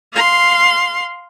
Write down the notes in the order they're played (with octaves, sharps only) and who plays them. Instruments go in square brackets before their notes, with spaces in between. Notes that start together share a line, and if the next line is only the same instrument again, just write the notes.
[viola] F5 C6